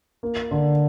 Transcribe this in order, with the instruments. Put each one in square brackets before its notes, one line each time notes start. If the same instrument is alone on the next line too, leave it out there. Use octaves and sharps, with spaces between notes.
[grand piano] A#3
D3